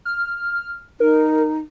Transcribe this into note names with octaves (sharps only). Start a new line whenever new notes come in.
F6
D#4 A#4